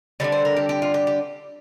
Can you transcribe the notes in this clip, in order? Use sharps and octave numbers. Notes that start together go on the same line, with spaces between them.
D3 G3 D4 A5
C5
A#4
G4
G4
F4
G4
G4